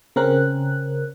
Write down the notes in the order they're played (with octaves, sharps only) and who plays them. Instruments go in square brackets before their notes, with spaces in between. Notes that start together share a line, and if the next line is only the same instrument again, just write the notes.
[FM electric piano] C#3 C4 C#4 A#4 F#6